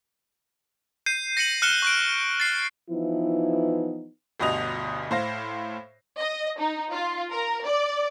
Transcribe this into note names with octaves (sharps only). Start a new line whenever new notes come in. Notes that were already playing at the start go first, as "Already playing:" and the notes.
G6 C7 D#7
A#6 C7 C#7 D#7 F#7
F6 F#6 C#7 E7 G7
C#6 F#6 D7
A6 C7
E3 F3 B3 D#4 E4
G1 D2 G2 B2 D#5 F7
A2 C5 F5 A#6
D#5
D#4
F4
A#4
D5